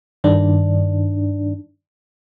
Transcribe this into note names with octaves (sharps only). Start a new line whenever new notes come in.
G2 D#3 D4